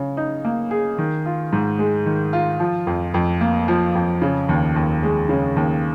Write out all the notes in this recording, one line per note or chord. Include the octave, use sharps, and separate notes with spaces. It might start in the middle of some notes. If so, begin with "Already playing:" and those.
Already playing: C#3
D#4
A#3
G#4
D#3
F4
G#2
G#3
D#3
F4
F3
F2
F2
A#3
F3
F2
C#3
D#2
D#2
G#3
C#3
D#2